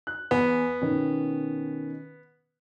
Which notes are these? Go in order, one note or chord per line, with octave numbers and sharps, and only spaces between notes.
F#6
E2 B3 G#5
B2 D#3 C#4